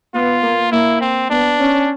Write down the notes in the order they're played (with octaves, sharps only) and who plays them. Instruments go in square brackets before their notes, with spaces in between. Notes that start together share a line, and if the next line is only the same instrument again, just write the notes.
[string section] B3 [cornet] F4
[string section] A#3
[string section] A#3 [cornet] E4
[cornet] C4
[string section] B3 [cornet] D4
[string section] C#4